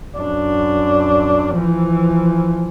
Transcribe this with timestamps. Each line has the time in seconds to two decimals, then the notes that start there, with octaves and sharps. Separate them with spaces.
0.17 F#2 D4
1.57 E3 F3